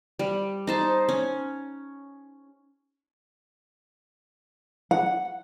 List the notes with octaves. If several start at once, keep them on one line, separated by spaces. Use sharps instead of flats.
G3
D#4 C5 A5
C#4
F#5